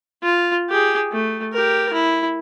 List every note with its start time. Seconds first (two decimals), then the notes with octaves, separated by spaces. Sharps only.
0.23 F4
0.70 G4 G#4
1.12 A3
1.53 G4 A#4
1.93 E4